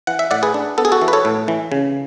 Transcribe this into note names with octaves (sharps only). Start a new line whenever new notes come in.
E3 F#5
E5
A2 D5 F#5
G#4 B4
D4
B3 A4
G#4
F#4 A4
E3
B4
A4 C#5
A2
E3
C#3